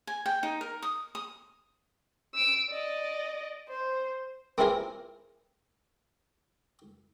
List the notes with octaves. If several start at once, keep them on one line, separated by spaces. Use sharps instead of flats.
G#5
G5
D#4
A#4
D#6
D#6
E6 D7
D5 D#5
C5
A#3 C4 E4 F4 G#4 A#4